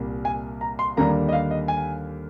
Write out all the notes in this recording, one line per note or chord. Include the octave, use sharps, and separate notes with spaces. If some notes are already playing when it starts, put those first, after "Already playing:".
Already playing: C2 A#2 G3 A#3
G#5
A#5
C6
D#2 D3 G3 A#3 A#5
D#5
F5
D#5
G#5